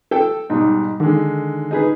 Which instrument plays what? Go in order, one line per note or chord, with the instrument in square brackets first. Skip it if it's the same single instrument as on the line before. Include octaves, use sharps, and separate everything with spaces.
[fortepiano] A4 G5
[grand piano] G#2 B2 G3 [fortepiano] D#4
[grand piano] D3 G#3 [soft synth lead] D#3
[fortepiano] D#4 G#4 B4